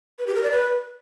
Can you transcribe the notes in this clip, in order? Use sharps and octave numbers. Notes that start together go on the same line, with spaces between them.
B4
G4
A#4
D5
B4